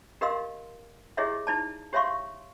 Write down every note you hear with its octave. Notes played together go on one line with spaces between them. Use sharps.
G4 A#4 D#5 F5 C6 E6
E4 G4 G#4 C#5 D#5 E5
D#4 E4 D5 A5
G4 C#5 E5 F5 C6 C#6